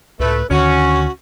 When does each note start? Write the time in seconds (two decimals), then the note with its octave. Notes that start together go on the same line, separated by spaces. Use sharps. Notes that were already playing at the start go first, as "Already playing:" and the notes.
0.20 C#2 A2 A3 B4
0.50 D2 D3 D#3 C#4 F#4